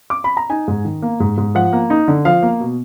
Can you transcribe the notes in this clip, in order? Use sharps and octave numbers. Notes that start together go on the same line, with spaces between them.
D6
B5
A#5
D#4 G#5
G#2
D#3
A#3
G#2
G#2
F3 F#5
A#3
D#4
D3
F3 F5
A#3
B2